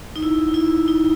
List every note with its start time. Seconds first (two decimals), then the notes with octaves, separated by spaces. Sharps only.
0.16 D#4
0.23 E4
0.54 E4
0.88 D#4